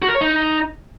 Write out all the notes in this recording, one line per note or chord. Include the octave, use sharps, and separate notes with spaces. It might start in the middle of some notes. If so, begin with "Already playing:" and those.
F#4
A#4
C#5
D#4